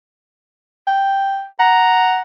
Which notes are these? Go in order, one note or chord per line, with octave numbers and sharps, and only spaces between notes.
G5
F#5 A#5